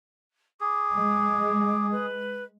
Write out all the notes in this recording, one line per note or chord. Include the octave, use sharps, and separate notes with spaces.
G#4 D6
G#3
B4